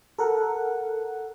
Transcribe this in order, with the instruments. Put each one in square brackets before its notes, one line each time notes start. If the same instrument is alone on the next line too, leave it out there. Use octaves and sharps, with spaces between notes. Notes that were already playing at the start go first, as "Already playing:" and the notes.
[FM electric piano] A4 A#4 F#5